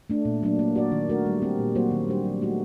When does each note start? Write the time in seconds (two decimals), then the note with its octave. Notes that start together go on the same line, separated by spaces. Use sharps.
0.10 A3 D4
0.25 A#2
0.43 F#3 A#3 D4
0.59 A#3
0.75 F#4 A#4 D5
0.92 D#3
1.09 A3 D4 F#4 A#4
1.25 G3
1.42 C4 G4 A#4
1.58 A#2
1.75 F#3 A#3 F#4 C5
1.91 D#3
2.08 G3 D4 G4 C5
2.24 F#3
2.41 A3 D#4 F#4